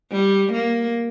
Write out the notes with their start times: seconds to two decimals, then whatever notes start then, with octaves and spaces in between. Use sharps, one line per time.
0.12 G3
0.53 A#3